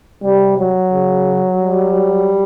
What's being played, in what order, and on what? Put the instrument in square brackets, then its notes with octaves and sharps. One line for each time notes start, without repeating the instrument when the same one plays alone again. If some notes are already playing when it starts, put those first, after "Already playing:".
[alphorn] C3 [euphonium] G3
[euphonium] F#3
[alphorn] C#3
G3